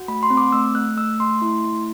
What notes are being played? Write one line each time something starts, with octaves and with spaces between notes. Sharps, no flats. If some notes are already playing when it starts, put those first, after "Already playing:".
Already playing: F#4
A3 B5
C6
C4
D6
A3 E6
A3 F#6
A3 E6
A3 C6
E4
A3